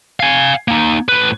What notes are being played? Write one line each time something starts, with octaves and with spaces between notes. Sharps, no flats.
F5 G#5
A#3 D#4
A2 B4